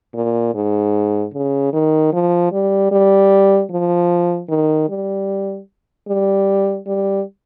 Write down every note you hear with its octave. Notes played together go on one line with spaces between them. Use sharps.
A#2
G#2
C#3
D#3
F3
G3
G3
F3
D#3
G3
G3
G3